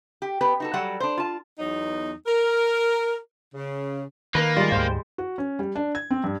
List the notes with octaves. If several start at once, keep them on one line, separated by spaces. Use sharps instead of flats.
G4
B3 G4 B4
D#4 F#4 A4
F#3 G3 A4 F#5
D4 C5
F4 A5
E2 F#3 B3 D#4
A#4
C#3
D#3 A#3 A#4 B4
G3 G#3 F4
D2 G#2 C5 G5
F#4
C#4
G3
D4
G#6
C4
G2